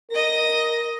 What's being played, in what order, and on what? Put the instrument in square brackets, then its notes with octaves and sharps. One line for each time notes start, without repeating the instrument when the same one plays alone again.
[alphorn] A#4 [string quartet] D#5 A#6